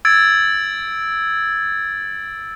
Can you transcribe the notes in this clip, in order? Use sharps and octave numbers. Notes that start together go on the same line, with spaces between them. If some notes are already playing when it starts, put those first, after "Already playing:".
E6 G#6 A6 D7